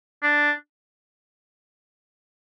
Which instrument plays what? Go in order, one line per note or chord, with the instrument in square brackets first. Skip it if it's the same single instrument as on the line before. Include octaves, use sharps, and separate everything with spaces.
[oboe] D4